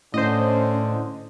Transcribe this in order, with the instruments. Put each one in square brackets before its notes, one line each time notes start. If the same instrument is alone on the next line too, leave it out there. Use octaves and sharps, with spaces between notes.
[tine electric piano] A2 [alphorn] D3 [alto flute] C#4 [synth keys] C5 D#5